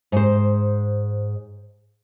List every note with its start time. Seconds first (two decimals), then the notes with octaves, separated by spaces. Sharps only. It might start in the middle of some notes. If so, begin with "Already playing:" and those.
0.12 G#2 C5